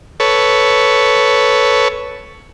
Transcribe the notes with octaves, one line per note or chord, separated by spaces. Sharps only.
A4 B4 C#5